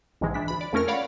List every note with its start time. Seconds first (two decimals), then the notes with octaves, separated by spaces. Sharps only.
0.21 A#1 G#2 C3 E3 G#3
0.34 E3 D4 B6
0.48 D2 B5
0.61 D5
0.73 F2 A3 C#4 A#4 F6
0.88 C#5 D5 F5 F#5 B5